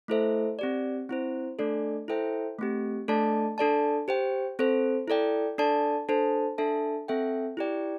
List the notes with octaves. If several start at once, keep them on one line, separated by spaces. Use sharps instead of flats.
A3 E4 A4 C5 E5
C4 G4 D5
C4 E4 C5
A3 D4 A4 D5
E4 A4 C5 E5 G5
A3 C4 G4
A3 D4 A4 D5 A5
D4 A4 D5 A5
G4 C5 G5
C4 A4 C5
E4 A4 D5 G5
D4 A4 D5 A5
D4 A4 C5 A5
D4 A4 E5 A5
C4 A4 E5 G5
E4 G4 D5 G5